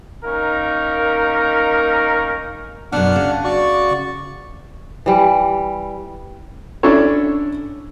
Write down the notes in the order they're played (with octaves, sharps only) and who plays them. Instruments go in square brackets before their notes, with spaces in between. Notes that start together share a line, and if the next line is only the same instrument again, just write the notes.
[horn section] A#3 C#4 D#4 A#4
[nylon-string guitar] F#2 B2 [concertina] D4 F#5 F6
[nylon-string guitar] C#3
[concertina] F#4 D5 C#6
[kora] E3 G3
[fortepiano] C#4 D4 E4 A4 C#5